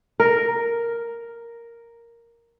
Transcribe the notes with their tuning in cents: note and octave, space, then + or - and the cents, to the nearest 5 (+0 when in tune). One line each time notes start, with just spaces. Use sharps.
A#4 +0